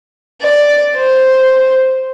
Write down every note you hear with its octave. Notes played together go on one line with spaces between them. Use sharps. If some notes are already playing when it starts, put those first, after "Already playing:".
D5
C5